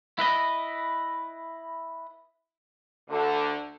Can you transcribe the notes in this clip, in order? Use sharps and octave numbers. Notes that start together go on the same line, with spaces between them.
E4 B4 D#5
D2 D3